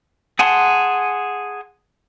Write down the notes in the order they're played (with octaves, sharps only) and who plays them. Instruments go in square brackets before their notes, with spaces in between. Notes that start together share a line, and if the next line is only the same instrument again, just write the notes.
[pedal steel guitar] G#4 F#5 G#5 A5 C6